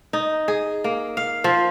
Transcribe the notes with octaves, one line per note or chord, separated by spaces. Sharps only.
D#4
G#4
A#3
F5
F3